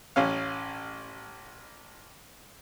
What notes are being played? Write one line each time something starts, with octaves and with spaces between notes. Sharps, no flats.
A1 C#4 F5